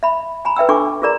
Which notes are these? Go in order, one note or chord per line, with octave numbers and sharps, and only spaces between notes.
E5 B5
G#5 A#5 B5
B4 E5 G5 E6
D4 F4 A4 G#5 C#6 D6
F4 G#4 A#4 D5 A#5